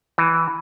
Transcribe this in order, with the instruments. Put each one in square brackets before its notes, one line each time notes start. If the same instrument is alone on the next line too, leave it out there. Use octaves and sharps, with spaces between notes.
[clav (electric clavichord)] E3